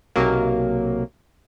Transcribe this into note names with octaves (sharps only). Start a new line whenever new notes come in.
B1 C3 F#3 A#3